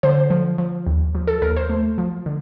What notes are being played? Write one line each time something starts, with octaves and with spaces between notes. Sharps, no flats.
D3 C5
F3
F3
D#2
F3
A4
D#2 A#4
C5
A3
F3
D3